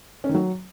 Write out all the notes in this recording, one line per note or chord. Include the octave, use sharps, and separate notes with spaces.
C#4
D#3
F#3